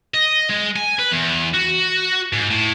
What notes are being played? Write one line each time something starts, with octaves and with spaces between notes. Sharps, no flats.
D#5
G#3
G#5
B4
E2
F#4
G#2
A2